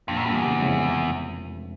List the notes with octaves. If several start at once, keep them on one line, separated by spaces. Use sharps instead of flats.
A#1 F2
F#2
F2 A#2 G3
E2
F#1
F2 C#3 E3 G#3
F1